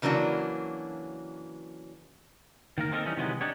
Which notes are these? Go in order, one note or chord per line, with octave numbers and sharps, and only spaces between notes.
C#3 E3 F#3 A#3 D4 F#4
D#3 A#3 A#4
A#3 C4 D#4 G4 A4 A#4
E3 G3 C#4 D#4
C3 D#3 E3 F#3 G#3 B3
D4 D#4 G4 C#5